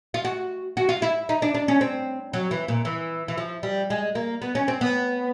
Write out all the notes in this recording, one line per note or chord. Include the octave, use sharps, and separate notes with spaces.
F4
F#4
F#4
F4
E4
D#4
D4
D4
C#4
C4
F#3
E3
A#2
E3
E3
F3
G3
G#3
A#3
B3
C#4
C4
B3